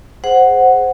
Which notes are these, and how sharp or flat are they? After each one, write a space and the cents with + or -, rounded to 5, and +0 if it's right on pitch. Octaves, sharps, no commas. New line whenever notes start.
G#4 +0 C5 +0 F#5 +0